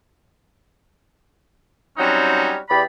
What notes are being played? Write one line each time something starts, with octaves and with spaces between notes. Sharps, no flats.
F#3 G3 C4 C#4 D#4 F#4
E2 G4 D5 B5